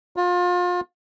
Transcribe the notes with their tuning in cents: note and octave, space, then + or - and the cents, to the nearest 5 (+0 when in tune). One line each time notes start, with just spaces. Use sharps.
F4 +30